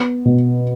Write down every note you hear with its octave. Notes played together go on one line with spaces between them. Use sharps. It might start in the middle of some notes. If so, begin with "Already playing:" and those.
Already playing: B3
B2